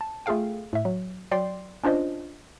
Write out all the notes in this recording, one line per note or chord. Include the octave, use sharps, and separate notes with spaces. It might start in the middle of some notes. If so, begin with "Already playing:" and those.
A5
A3 F4 G#4 A4 F5 G5
A2 E5
F#3
F#3 D5 G5 C6 C7
C#4 D4 F4 C5 D#5